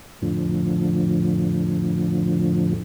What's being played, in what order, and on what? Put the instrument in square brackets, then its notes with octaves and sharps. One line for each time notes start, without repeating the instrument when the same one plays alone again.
[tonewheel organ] F2 A2 D3 F3